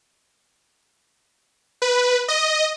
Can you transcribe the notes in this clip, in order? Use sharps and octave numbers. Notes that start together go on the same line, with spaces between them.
B4
D#5